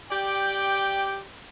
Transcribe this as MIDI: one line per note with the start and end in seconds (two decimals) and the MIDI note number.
0.10 1.21 67
0.10 1.21 74
0.10 1.21 79